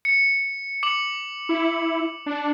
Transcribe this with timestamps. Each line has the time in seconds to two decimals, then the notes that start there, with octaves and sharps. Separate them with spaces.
0.05 C#7
0.83 D6 C#7 F#7
1.49 E4
2.26 D4